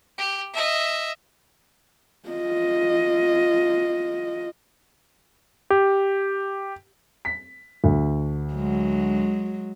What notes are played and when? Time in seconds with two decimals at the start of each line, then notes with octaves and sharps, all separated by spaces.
0.18 G4
0.54 D#5 E5
2.29 F4 D#5
5.70 G4
7.25 B6
7.84 D2
8.54 F#3 G#3